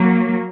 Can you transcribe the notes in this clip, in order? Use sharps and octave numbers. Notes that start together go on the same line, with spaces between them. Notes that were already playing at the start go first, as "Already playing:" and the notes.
Already playing: F#3 A#3